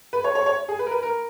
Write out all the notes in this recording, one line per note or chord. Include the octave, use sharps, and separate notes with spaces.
B4
C#5
C#5
C#5
G#4
B4
A#4
B4
A#4